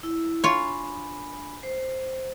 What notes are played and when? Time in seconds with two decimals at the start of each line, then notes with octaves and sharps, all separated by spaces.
0.03 E4
0.44 D4 F4 C#5 G#5 B5
1.63 C5